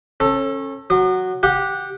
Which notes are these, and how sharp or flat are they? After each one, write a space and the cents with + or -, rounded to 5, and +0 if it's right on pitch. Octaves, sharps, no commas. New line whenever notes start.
C#4 -30 A4 +10
F#3 +0 D#6 -45
G4 +0 F#5 -20